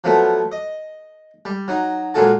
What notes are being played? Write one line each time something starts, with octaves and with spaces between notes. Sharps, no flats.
F3 F#3 A3 B3
D#5
G3
F#3 D#4
A#2 F#3 G#3 F4 A4 A5